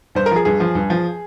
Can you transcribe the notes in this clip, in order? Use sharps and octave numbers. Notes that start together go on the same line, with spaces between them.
G2 C5
A#4
F3 G#4
G2 G#4
F3
G2
F3